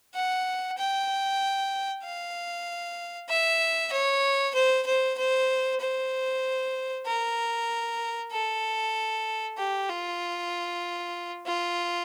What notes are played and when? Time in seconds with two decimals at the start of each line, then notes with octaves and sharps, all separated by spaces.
0.14 F#5
0.78 G5
2.03 F5
3.29 E5
3.92 C#5
4.54 C5
4.86 C5
5.17 C5
5.80 C5
7.06 A#4
8.32 A4
9.57 G4
9.89 F4
11.46 F4